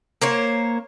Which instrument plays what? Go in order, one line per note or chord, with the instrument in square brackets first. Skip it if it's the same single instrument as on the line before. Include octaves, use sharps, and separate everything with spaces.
[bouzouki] A#3 C5 C#5